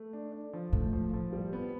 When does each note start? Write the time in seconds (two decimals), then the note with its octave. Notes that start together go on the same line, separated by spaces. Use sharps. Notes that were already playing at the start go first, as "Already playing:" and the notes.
Already playing: A3
0.13 D4
0.32 D4
0.53 F3
0.72 A2 A3
0.93 F3
1.14 F3
1.33 G3
1.53 B3